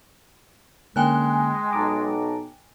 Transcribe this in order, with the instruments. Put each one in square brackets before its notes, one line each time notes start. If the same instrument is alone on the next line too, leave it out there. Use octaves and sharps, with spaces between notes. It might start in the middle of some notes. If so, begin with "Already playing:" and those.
[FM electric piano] D3 A#3 C#4 [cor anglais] G#3 [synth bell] G5 G#5 F#6
[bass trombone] B1 [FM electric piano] A5 A#5 D6